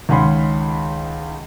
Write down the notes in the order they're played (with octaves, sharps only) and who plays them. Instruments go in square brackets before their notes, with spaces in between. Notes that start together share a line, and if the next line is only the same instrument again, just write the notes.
[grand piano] C#2 D#3 C#4 F#5 B5 C6